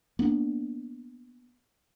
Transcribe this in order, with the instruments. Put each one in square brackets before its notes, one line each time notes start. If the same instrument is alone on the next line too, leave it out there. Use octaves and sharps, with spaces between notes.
[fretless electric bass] A#3 B3 D4